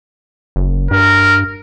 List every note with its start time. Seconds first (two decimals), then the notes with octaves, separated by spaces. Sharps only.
0.56 F#1
0.91 G2 A#4